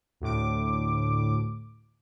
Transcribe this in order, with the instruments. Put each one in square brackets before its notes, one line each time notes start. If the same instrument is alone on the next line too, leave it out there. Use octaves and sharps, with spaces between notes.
[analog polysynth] D2 A2 D6